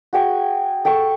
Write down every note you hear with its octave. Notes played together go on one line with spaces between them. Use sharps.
F#4 G#4 G5 C#6
A4 G5 A5 C#6